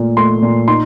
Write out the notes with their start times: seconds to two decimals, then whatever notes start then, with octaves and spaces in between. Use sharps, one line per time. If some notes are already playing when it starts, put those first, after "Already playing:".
Already playing: A#2 A3
0.17 A3 C6
0.42 A#2
0.68 D#4 C6